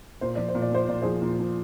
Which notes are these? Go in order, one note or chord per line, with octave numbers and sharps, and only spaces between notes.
A#2 C5
F3 D5
C5
A#2
D5
F3 C5
A#2 D5
F3 G#4 C5
A#2
F3